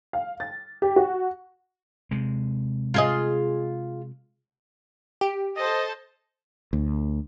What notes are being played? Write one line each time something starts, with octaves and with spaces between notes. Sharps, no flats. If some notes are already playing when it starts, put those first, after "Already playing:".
F5
A6
G4
F#4
C3 G#3
F4 G#4 D#5
G4
A4 C5 D#5 A5
D2